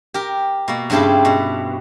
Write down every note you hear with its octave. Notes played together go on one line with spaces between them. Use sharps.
G4 A#4
B2 A#3
G2 C#3 C4 E4 G4 A4
B2